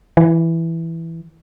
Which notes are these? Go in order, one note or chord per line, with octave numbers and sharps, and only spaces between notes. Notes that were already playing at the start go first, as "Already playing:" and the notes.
E3